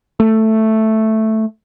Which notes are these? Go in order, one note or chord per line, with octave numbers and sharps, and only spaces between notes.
A3